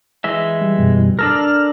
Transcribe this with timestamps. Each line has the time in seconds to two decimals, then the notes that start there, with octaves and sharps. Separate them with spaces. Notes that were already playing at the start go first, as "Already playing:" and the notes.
0.24 E3 G#3 E5
0.61 G3
0.78 F#2 B2 G3
1.19 D4 A4 A#4 F6